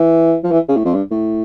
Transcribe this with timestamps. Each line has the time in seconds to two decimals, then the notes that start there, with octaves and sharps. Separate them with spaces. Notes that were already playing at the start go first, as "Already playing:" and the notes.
Already playing: E3
0.44 F3
0.51 E3
0.69 C#3
0.76 A2
0.85 F2
0.94 G2
1.11 A2